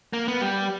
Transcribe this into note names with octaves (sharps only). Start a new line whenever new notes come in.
A#3
B3
G3